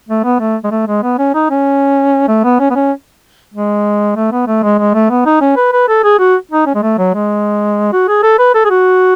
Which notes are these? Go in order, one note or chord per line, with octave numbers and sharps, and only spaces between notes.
A3
B3
A3
G#3
A3
G#3
B3
C#4
D#4
C#4
A3
B3
C#4
B3
C#4
G#3
A3
B3
A3
G#3
G#3
A3
B3
D#4
C#4
B4
B4
A4
G#4
F#4
D#4
C#4
G#3
A3
F#3
G#3
F#4
G#4
A4
B4
A4
G#4
F#4